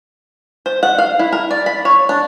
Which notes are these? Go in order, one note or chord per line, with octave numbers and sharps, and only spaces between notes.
C5
F#5
F5
E4
A#4
D5
B5
C#5
D4